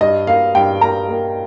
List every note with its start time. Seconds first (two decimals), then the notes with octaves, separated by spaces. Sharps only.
0.01 G2 D#5
0.27 A#3 F5
0.55 G2 G5
0.81 A#3 A#5
1.09 A#3